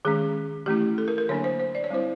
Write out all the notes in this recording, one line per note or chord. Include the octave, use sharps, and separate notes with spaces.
D#3 G#3 C#4 G#4
E3 A3 C#4 E4 G4
A4
A#4
A#4
D3 F#3 A#3 D4 C#5
C5
C5
D5
C#5
G3 C4 E4 C5